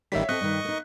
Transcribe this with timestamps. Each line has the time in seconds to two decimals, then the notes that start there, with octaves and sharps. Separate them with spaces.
0.12 A1 D#3 G3 C#5 E5 F5 B6
0.29 C4 A4 D#5 C#6 F#6
0.41 G2 D#3
0.65 A#3 D#4